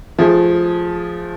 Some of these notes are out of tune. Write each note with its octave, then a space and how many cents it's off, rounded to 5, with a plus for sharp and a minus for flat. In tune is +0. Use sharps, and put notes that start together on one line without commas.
F3 +0 A3 -25 G#4 +0